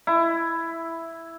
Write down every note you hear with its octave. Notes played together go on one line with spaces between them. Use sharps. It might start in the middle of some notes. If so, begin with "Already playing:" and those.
E4